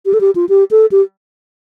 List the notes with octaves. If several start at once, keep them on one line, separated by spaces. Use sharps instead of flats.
G4
A4
G4
F4
G4
A4
G4